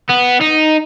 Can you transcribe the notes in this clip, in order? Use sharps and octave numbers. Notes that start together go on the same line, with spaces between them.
B3
D#4